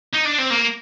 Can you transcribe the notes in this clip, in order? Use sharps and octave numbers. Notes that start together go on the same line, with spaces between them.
D#4
D4
C4
A#3